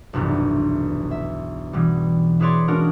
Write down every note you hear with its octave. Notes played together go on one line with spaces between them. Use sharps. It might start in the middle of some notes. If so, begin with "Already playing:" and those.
F1 B1 E2 G2
E5
B2 E3 G3
E4 G#4 B4 C#5 D5 C6
G#3 A#3 C#4 D4 F#4 A#4